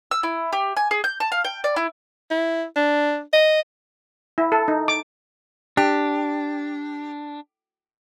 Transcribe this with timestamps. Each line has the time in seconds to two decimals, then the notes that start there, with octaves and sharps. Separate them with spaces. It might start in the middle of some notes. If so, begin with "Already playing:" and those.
0.11 E6
0.23 E4
0.53 G4
0.77 G#5
0.91 G#4
1.04 G6
1.20 A5
1.32 F5
1.45 G5
1.64 D5
1.76 E4
2.31 E4
2.76 D4
3.33 D#5
4.38 E4
4.52 A4
4.68 D#4
4.88 D6
5.77 D4 G4